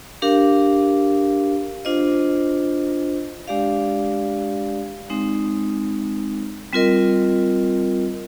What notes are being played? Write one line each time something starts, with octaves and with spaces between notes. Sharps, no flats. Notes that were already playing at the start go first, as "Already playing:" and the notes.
D4 G4 A#4 F5
D4 F4 C5 D#5
G#3 D4 G4 D5 F5
G#3 C4 D#4
G3 C4 F4 A#4 D#5